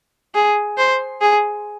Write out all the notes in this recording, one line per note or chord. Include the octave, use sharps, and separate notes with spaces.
G#4
C5
G#4